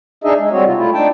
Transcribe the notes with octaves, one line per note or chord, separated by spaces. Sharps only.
D4 D#4 G#4 D#5 E5
G#3
G3 C4 F#4 C#5
C3 F4
A3 E4 F4
D4 D#4 G5 A5